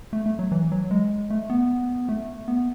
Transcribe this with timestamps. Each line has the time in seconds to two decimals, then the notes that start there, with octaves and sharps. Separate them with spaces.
0.13 A3
0.26 A3
0.39 F#3
0.52 E3
0.72 F#3
0.91 G#3
1.30 A3
1.50 B3
2.09 A3
2.48 B3